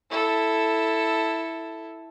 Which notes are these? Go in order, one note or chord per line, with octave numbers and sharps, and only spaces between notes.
E4 A4